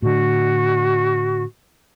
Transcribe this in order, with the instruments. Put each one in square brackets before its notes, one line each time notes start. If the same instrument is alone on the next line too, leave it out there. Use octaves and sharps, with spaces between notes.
[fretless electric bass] A2 D3 [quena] F#4